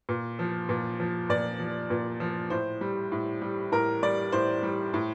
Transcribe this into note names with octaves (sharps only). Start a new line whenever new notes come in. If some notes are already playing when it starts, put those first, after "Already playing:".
A#2
F3
A#2
F3
A#2 D5
F3
A#2
F3
A2 C5
G3
A2
G3
A2 A#4
G3 D5
A2 C5
G3
A2